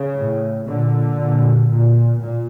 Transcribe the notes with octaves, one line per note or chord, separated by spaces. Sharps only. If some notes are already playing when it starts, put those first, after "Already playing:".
Already playing: C#3
A2
A#2 D3
A#2
A#2
A#2